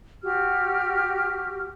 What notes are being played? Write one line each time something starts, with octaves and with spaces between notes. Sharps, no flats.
F#4 G4 F6